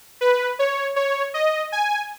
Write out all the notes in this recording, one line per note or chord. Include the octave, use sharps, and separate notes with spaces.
B4
C#5
C#5
D#5
G#5